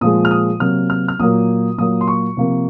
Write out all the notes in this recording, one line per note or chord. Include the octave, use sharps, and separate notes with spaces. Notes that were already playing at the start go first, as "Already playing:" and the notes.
A#2 F3 G#3 D#6
F6
D#6
C3 F#3 A#3 F6
F6
F6
A#2 F#3 A#3 D#6
A#2 F#3 A#3 D#6
C6
C#6
C3 F3 A#3